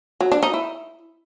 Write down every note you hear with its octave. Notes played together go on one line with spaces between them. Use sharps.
F#3
D4
D#4
E4